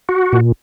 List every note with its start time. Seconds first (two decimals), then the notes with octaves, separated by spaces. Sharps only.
0.09 F#4
0.33 A#2